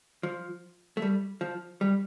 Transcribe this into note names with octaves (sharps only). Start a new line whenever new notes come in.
F3
A3
G3
F3
G3